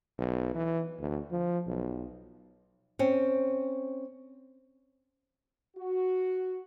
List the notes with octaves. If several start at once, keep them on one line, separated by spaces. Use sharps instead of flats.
B1
E3
D2
F3
B1
C4 C#4
F#4